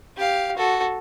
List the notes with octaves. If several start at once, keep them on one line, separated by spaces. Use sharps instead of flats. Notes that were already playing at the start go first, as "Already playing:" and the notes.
G4 F5
F#4 A4